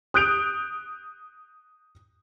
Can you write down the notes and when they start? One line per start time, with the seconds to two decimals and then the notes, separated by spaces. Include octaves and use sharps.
0.14 D#6 F#6 G6 D7 F7